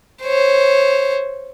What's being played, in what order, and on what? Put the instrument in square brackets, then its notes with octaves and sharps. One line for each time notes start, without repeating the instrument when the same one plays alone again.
[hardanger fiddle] C5 C#5